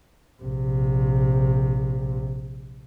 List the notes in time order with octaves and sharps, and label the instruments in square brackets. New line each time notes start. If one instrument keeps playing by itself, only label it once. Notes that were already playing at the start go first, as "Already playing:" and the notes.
[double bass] A#1 C3